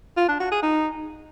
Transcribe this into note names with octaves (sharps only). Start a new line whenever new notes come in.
F4
D4
F#4
G#4
D#4